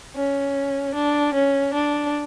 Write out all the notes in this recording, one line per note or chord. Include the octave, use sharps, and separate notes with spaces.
C#4
D4
C#4
D4